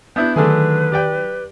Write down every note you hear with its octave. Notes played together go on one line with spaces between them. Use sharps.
B3 D4 E4 G6
D3 D#3 F#3 A3 G#4 B4
G4 D5 G5